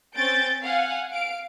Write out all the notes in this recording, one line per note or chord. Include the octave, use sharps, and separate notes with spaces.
C4 C#4 G6 A6 D7
F5 F#5 G#5
F5 D7